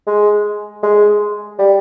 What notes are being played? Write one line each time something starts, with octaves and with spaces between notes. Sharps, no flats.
G#3
G#3
G3